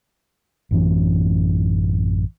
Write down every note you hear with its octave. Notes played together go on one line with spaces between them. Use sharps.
A1 F#2 E3 C#4